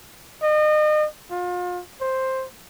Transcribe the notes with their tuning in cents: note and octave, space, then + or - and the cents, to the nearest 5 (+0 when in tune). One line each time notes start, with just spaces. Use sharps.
D#5 -35
F4 +35
C5 +5